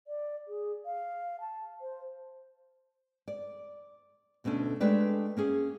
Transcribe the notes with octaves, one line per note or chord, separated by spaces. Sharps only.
D5
G#4
F5
A5
C5
D5
D2 B2 A3 C#4 D4
G#3 A3 D4 G4 B4 D5
A#3 C#4 G#4